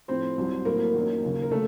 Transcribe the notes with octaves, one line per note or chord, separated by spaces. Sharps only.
A2 F3 C4 C5
C2 C3 F#3
A2 F#3 A#3 A#4
F#2 D#3 F#3
D#2 C#3 F#3
A#4
C#3 A3 A4